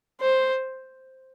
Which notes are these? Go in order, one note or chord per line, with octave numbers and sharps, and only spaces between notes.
C5